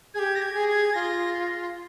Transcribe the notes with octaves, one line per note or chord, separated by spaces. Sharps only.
G4 G#4 G#6
A#6
G#6
G#4
G#6
F4 A#6